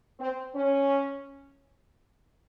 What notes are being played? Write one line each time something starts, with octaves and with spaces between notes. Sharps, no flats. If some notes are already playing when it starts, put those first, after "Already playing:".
C4
C#4